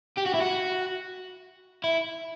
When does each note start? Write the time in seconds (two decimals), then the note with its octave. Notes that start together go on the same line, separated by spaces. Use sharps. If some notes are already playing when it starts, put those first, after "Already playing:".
0.17 G4
0.26 F#4
0.34 E4
0.41 F#4
1.84 E4